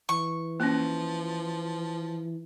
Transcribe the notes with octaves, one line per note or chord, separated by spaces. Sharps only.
E3 C#6
F3 A#3 C#4